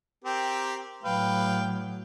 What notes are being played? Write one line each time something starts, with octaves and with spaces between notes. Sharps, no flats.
C4 G4 A#4
A2 F#3 B4 F5 G5